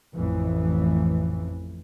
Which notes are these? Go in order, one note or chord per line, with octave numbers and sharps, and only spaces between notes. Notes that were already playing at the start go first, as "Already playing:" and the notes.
A1 F2 E3